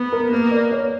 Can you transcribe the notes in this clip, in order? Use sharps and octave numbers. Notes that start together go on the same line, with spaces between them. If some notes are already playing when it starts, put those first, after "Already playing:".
Already playing: B3 B4
A#4
A#3 B4
D5
C#5